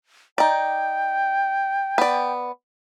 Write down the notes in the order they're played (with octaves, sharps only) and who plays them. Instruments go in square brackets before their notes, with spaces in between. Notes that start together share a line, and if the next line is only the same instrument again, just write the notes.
[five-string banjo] D#4 D5 [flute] G5
[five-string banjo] B3 D5